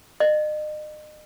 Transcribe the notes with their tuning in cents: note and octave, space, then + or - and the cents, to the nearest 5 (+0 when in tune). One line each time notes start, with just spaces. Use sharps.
D#5 -40